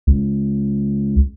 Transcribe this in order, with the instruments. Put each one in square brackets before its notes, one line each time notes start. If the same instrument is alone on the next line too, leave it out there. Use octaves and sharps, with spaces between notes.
[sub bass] C#2